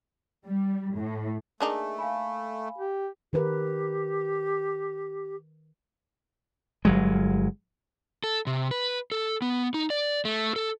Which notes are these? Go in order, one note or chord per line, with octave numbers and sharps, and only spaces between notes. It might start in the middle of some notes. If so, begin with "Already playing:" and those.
G3
A2
A3 A#3 D4 D#4 G#4 A4 G#5
F5 G#5 B5
G4
D#3 G4 A#4 B4
G1 F#3 G#3
A4
C3
B4
A4
B3
D#4
D5
A3
A4